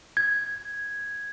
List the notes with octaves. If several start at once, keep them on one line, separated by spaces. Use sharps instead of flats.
G#6